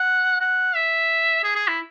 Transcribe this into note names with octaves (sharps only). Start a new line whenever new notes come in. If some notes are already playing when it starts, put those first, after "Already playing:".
Already playing: F#5
F#5
E5
G#4
G#4
E4